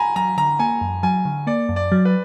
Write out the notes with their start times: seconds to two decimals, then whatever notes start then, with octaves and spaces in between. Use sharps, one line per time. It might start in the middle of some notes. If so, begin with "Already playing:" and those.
Already playing: G#5 A#5 B5
0.16 F#3 A#5
0.37 D3 A#5
0.59 A#3 G#5
0.81 F#2
1.03 F#3 G#5
1.25 D3
1.47 A#3 D5
1.69 F#2
1.76 D5
1.92 F#3
2.05 B4